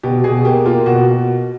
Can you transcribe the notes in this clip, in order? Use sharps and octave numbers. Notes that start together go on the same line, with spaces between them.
B2 G4
B2 G#4
A#3 G4
A#3 F4
B2 F#4